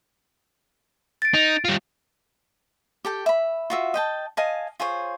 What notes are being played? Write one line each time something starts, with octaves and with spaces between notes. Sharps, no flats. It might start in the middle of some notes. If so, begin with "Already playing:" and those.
A6 D7
D#4
G3 F4
G4 A4 G5
E5 B5
F4 F#4 E5
D#5 G5 A5
D#5 F5 G#5 A5
F4 G#4 C5 C#5